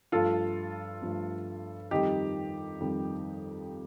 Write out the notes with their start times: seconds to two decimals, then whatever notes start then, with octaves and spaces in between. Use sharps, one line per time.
0.12 G2 F3 A3 F4 A4
1.02 G2 F3 A3
1.91 F2 D#3 G3 D#4 G4
2.80 F2 D#3 G3